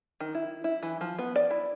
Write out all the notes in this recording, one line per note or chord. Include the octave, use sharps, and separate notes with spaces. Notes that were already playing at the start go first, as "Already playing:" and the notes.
D#3
E4
E4
E3
F3
B3
D5
E4